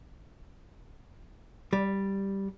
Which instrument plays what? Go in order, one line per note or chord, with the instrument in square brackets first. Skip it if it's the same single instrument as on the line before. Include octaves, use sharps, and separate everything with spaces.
[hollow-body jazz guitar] G3